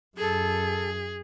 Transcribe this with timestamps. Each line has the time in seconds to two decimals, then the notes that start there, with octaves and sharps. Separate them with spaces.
0.17 F#2 G#4 A4